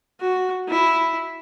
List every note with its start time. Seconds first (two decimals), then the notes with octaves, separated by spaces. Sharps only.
0.20 F#4
0.69 E4